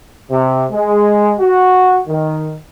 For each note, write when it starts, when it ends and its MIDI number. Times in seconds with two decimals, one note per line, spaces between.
0.30 0.65 48
0.71 1.33 56
1.38 1.98 66
2.07 2.54 51